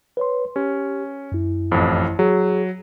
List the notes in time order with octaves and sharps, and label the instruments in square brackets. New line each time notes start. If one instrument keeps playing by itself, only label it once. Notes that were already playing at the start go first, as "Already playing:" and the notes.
[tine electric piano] B4 C#5 C6
[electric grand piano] C#4 [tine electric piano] G4
[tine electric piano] F#2 E4
[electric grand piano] A1 F2
[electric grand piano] F#3 [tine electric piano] G#4